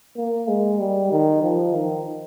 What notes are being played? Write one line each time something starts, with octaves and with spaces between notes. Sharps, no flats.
A#3
G#3
G3
D#3
F3
D#3